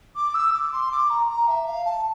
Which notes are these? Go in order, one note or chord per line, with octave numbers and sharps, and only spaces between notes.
D6
E6
D6
C6
D6
A#5
A#5
E5
F5
A5